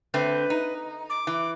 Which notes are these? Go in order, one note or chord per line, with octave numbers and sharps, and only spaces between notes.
D3 A3 C4 B4
D#4
D6
E3